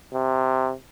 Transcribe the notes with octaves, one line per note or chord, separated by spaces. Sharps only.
C3